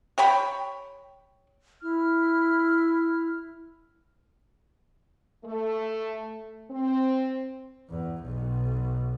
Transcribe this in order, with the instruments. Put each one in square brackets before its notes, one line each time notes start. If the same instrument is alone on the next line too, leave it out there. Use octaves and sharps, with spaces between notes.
[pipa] G4 C#5 G5 B5
[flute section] E4 F6
[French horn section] A3
C4
[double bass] E2
B1